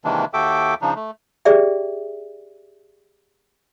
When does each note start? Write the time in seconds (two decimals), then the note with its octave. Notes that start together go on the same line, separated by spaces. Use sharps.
0.05 C3 D#3 E3 G#3 A#3 D4
0.34 D#2 F#4 A4 E5 G5 D6
0.82 C#3 F3 D4 D#4
0.96 A3
1.45 G4 G#4 D5 E5 G5